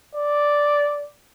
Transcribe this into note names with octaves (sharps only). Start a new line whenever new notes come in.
D5